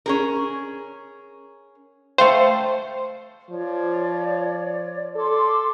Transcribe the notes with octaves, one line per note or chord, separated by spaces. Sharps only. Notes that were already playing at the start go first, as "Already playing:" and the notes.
C#4 G#4 A#4
A3 C5 F5 G5
F3 C#5 D5
A4 C6 D6